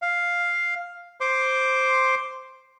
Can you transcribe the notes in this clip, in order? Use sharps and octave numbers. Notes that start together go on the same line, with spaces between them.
F5
C5 C6 D6